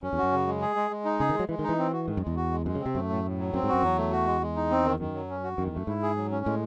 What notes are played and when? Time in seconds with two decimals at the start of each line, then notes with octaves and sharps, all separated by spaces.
0.03 F#2 C#4
0.13 E2
0.18 F#4
0.23 F#2
0.32 C#3
0.47 G#3
0.61 G#4
0.76 G#3
0.91 G#3
1.05 D#4
1.20 C#3 G#4
1.29 D#3
1.34 G#3
1.39 F#3
1.49 E3 G#3
1.59 D#3
1.64 D#4
1.69 E3
1.79 C4
1.92 F#4
2.08 G#2 D#3
2.17 F#2
2.22 E2 G#3
2.36 F#4
2.51 G#3
2.66 F#2 G#3
2.75 C#3
2.81 C4
2.86 C3
2.95 F#2 A3
3.09 A2
3.25 A2
3.39 F#3
3.54 F#2 C4
3.63 G#2
3.68 F#4
3.73 F#2
3.83 E2 F#3
3.97 A3
4.12 F#4
4.26 G#3
4.42 G#3
4.56 D#4
4.70 C4
4.85 D#3
4.99 F#2 D#3
5.14 F#3
5.29 C#4
5.44 F#4
5.58 F#2 D#3
5.67 E2
5.73 F#2 A3
5.87 G#2 E4
6.02 G#4
6.17 F#3
6.31 C#4
6.46 A2 G#3